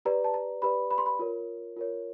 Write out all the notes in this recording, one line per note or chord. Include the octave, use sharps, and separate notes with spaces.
G4 B4 D5 A#5
A5
A#5
G4 B4 D5 B5
B5
C6
B5
F4 A#4 C#5
F4 A#4 C#5